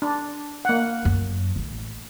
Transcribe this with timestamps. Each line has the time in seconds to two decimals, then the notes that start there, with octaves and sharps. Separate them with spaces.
0.02 D4
0.65 A#3 F#5
1.05 F#2
1.56 A1